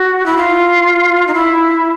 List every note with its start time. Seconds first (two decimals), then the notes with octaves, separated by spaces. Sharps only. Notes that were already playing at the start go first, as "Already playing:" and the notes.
Already playing: F#4
0.26 E4
0.37 F4
1.28 D#4
1.34 E4